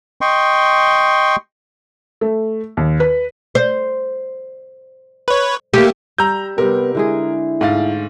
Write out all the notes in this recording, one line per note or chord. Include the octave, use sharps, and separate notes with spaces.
D#5 G5 C6 C#6
A3
D#2
B4
C5
B4 C#5
A3 A#3 G4
G3 A#5 E6 G6
C3 G3 B3 A#4
D3 G#3 E4 G#4
G#2 A3 F5 A6